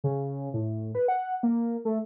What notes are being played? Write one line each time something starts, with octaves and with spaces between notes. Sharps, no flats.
C#3
A2
B4
F#5
A#3
A3